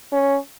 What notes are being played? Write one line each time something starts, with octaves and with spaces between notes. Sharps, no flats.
C#4